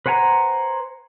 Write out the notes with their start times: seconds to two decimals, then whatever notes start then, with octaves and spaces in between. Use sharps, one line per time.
0.06 B4 C5 F#5 G#5 A#5